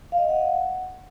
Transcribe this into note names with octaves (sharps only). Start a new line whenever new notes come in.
F5
D#5
F5
F#5